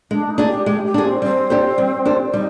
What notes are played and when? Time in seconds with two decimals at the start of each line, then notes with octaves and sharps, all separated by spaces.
0.11 G#3 D4
0.30 D#4
0.38 D4 G#4
0.47 G4
0.66 G#3 G4
0.85 G4
0.94 D4 G#4
1.04 C4
1.22 G3 C4
1.50 D4 G4 C5
1.78 G3
2.05 D4 G4 C5
2.33 G3 D#4